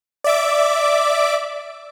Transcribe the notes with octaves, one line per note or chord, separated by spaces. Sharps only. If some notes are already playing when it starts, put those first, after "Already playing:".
D5 E5 D6